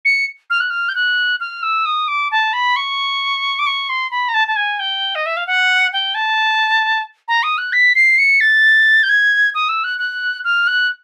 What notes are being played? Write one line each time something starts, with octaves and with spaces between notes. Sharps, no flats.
C#7
F6
F#6
F6
G6
F#6
F6
E6
D#6
D6
A5
B5
C#6
D6
C#6
C6
B5
A#5
A5
A5
G#5
G5
D#5
E5
F5
F#5
G5
A5
A#5
D#6
F#6
B6
C7
C#7
A6
G6
G#6
D#6
E6
F#6
F#6
F6
F#6